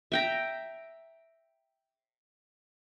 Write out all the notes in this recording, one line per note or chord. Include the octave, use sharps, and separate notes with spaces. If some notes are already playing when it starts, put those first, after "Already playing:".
E5 G5 A#5